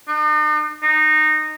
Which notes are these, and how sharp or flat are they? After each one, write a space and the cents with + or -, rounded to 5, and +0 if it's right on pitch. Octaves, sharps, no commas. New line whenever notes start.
D#4 -45
D#4 -15